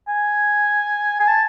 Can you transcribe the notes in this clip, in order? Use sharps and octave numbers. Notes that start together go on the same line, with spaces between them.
G#5
G#5
A5